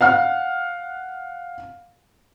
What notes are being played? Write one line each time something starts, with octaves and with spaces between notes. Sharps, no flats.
F5 F#5 F6